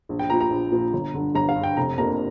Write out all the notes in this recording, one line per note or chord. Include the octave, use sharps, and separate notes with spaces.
A#1
G5
A#2 F3 A#5
A#5
A#1
A#2 F3
G1
G2 D3
G1 A#5
F5
G2
D3 G5
F1 A#5
F2 C3 A#3 D4 A#5